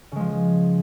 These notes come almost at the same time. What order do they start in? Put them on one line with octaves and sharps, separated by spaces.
C#3 G#3 F3